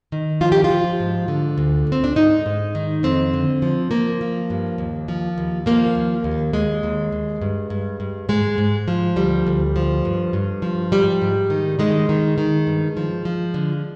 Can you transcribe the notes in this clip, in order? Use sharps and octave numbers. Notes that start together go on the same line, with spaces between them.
D#3
F3 F4
G4
F4
F3
G#2
D3
D2
D2
C4
D4
G#2 D#4
G#2
D#3
F2 C4
D3
F3
F3 A#3
F3
G2
D#2
F3
D#2
F3 A#3
D#2
D#2
D#2 G#3
D#2
D#2
G2
G2
G2
G#2 G#3
G#2
F3
D2 G3
D2
F3
G2
G2
F3
G#2 G3
G#2
D#3
D#3 G#3
D#3
D#3
G2
F3
F3
D3